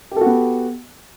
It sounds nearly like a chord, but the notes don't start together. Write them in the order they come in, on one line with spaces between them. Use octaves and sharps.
G4 A4 F#4 B3